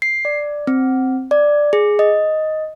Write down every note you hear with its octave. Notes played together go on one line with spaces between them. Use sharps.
C7
D5
C4
D5
G#4
D#5